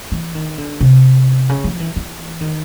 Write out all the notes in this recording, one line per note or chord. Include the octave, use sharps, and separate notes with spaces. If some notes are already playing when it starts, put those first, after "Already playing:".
E3
D#3
D3
C3
C#3
F3
E3
E3
D#3